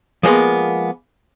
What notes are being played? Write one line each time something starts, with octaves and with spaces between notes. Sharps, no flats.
F3 G#3 A#3 B3